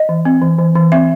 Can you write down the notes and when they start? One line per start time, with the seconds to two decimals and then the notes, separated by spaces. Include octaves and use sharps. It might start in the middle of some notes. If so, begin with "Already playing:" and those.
Already playing: D#5
0.09 E3
0.25 C4
0.42 E3
0.59 E3
0.75 E3
0.92 C4 E5